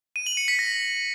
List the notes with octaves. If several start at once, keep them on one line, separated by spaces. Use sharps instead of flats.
D#7
F#7
C#7
B6
A#6